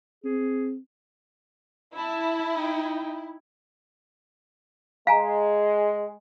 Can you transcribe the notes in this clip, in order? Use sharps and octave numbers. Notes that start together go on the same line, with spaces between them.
C4 G#4
E4 E5 A5
D#4 G5
G#3 F5 G#5 A#5